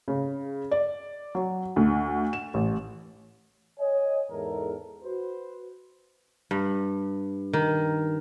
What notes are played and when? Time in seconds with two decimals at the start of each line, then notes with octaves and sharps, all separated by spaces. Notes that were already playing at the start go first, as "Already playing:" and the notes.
0.08 C#3
0.71 D5
1.35 F#3
1.76 D2
2.33 E7
2.54 A1
3.80 C#5 D#5 G#5
4.31 E2 G#2 A4 A#4
5.03 F#4 B4 C5
6.51 G2
7.53 D#3